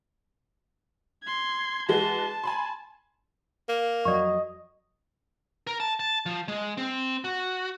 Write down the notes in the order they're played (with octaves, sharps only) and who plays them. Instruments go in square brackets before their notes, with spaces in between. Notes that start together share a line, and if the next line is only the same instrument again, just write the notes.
[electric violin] C6 G#6
[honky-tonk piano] E3 G#3 F#4 [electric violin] A5
[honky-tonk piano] G#5 B5 C6
[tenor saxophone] A#3
[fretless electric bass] F2 F#3 [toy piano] D5 C#6 [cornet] D#5
[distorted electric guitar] A#4
A5
A5
F3
G#3
C4
F#4